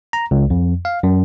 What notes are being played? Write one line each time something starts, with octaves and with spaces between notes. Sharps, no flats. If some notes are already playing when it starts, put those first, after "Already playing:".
A#5
C#2
F2
F5
F#2